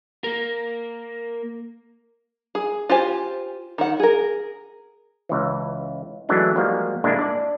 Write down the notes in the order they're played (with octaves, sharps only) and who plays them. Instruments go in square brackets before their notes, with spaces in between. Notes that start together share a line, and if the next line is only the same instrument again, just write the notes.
[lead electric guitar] A#3 A#4
[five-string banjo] G#4
F4 G4 C5 G#5
D#3 F#5
G#4 A#4
[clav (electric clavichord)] C#2 E3
E3 F#3 G#3 A3 C#4 D4
F3 G3 G#3 A#3 F4 F#4
A#2 D3 G#3 A#3 D4 E4
D4 D5